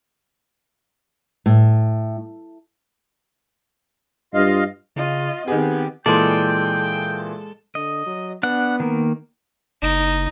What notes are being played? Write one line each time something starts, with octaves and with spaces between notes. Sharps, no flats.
A2
G2 F4 D#5 F5
C#3 F4 D#5
D#3 B3 C4 G4 G#4
A#2 E3 G#3 A4 D5 G5 C6
D3 D#5
F#3
B3 D4 F#5
D#3 A#3
F#1 D#4